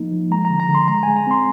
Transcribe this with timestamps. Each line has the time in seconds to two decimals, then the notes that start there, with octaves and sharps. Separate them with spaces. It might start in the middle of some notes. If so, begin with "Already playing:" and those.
Already playing: F3 A#3 D#4
0.12 F3
0.31 G#3 A#5
0.45 D3 A#5
0.60 A#5
0.69 D3
0.75 C6
0.88 G#3 A#5
1.03 G#3 G#5
1.16 A#5
1.27 C4 C6